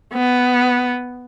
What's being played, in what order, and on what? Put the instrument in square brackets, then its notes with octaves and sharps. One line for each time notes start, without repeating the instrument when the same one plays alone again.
[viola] B3